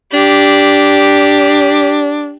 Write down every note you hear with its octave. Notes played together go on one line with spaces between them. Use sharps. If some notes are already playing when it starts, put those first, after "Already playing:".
D4 G4